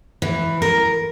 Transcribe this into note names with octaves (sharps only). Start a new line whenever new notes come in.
E3
A#4